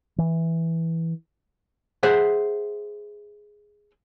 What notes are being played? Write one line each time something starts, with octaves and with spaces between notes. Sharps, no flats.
E3
G#4 C5 E5 F#5